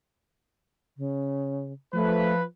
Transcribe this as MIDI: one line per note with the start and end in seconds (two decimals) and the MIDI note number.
0.98 1.72 49
1.94 2.43 53
1.94 2.33 57
1.94 2.43 71